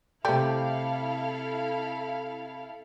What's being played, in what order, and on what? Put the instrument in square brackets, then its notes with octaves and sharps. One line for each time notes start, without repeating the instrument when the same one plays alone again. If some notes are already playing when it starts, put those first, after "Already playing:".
[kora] C3 G4 [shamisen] A3 D5 G5 [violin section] E4 A4 F5